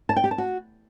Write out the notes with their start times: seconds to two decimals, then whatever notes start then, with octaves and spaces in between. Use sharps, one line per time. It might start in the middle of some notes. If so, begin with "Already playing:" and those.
0.09 A5
0.16 G5
0.24 G4
0.31 A5
0.38 F#4